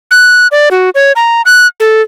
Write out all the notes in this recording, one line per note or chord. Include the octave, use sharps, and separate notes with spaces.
F#6
D5
F#4
C#5
A#5
F#6
A4